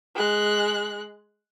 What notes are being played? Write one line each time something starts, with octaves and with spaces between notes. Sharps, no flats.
G#3 F#6